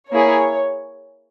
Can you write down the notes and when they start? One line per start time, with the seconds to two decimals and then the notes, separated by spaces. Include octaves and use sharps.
0.12 A#3 E4 G#4 C#5